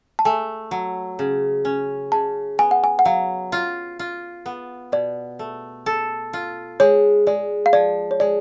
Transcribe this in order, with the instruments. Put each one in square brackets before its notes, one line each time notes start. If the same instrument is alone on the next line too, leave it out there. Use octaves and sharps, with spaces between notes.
[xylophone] A5
[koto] A3 [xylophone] G#5
[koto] F#3
C#3
C#4
[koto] C#3 [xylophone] A5
[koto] B3 [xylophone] G#5
[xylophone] F#5
G#5
F#5
[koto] F#3 [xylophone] F5
[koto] F4
F4
B3
[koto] B2 [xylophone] D5
[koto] A3
A4
F4
[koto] G#3 [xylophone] C#5
[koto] G#3 [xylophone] D5
[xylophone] F5
[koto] F3 [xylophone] D5
[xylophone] C#5
[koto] G#3 [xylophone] D5